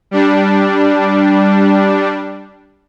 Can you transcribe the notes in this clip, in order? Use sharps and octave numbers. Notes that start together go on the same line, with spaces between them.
G3 D4